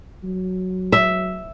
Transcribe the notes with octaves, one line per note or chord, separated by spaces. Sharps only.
F#3
E5